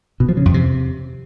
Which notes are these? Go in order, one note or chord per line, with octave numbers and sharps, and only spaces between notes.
B2
F3
C#3
F2
C3